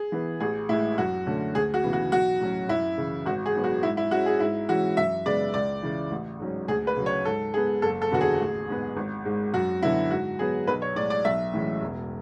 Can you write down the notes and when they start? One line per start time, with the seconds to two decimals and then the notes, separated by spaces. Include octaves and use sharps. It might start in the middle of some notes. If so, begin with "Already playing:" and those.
Already playing: G#4
0.12 E3 B3
0.40 A1 G#4
0.69 A2 G#3 E4
0.98 F#2 F#4
1.26 D3 A3 C#4
1.55 D2 G#4
1.74 F#4
1.84 C#3 E3 B3
1.93 F#4
2.12 B1 F#4
2.40 A2 F#3 C#4
2.69 F#2 E4
2.97 C#3 E3
3.26 G#1 F#4
3.46 G#4
3.54 G#2 F#3 B3
3.64 F#4
3.83 G#2 E4
3.97 E4
4.11 G#3 C#4 F#4
4.26 G#4
4.40 G#2 E4
4.69 E3 G#3 C#4 F#4
4.97 F#2 E5
5.26 C#3 G#3 B3 D5
5.54 C#2 D5
5.83 C#3 E3
6.11 A1
6.40 G#2 F#3 C#4
6.68 D2 G#4
6.87 B4
6.97 C#3 F#3
7.06 C#5
7.25 G#2 A4
7.53 G#3 B3 G#4
7.82 F#1 A4
8.02 A4
8.11 E2 D3 F#3 B3 F#4
8.21 G#4
8.40 A1
8.69 G#2 G#3 B3
8.97 G#1
9.25 G#2 G#3
9.54 F#2 F#4
9.82 D3 F#3 B3 E4
10.10 G#2 F#4
10.39 F#3 B3 G#4
10.67 B1 B4
10.82 C#5
10.96 A2 G#3 D5
11.10 D5
11.25 B1 E5
11.53 A2 E3 G#3 C#4
11.82 E1